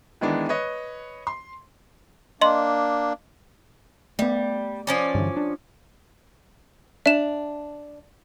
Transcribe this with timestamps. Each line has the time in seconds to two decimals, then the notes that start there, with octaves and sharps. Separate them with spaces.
0.21 D#3 E3 G#3 B3 D4
0.49 B4 C#5 D#5
1.27 C6
2.41 A#3 D4 D#5 C6
4.19 G3 A3 B3
4.87 F3 C#4 D5
5.15 G2 D3 E3
5.37 D4
7.06 D4 E5 E7